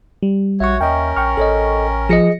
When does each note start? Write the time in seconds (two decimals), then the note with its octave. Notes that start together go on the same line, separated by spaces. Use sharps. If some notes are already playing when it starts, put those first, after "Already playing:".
0.23 G3
0.60 A#1 F#4 C#5 E5 C#6
0.81 D#2 C#4 A#4 D#5 G5
1.16 A#1 G5 C#6 F6
1.37 A1 A4 C#5 D#5
2.09 F3 G#4 D#5 A#6 C#7